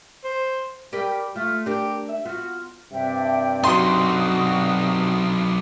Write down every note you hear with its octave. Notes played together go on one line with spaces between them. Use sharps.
C5
G3 G4 A#4 B4
A3 F4
D4 G4 A#4
E5
B3 F4 F#4
G2 C3 D4 E5 G5
F#3 D#4 F#4 C6 D#6